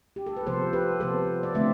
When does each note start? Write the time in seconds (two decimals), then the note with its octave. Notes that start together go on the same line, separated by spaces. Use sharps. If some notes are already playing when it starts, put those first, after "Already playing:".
0.16 G4
0.27 A4
0.37 B4
0.46 C3 F3 B3 A4 C5
0.73 G4 B4
1.00 C3 F3 B3 A4 C5
1.43 D5
1.55 D3 A3 C4 C5 E5